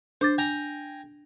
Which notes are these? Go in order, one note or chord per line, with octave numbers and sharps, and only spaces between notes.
D4 C5 D6 A6
G5 G#5 A#5